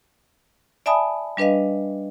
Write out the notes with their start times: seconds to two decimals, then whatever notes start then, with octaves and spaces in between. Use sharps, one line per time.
0.86 D5 E5 G#5 A5 B5 D#6
1.37 G3 D4 B4 D#5 F5